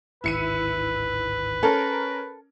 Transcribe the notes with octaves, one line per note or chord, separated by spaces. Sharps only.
D1 G#1 D#3 E4 B4 C#7 D#7
C#4 A4 A#4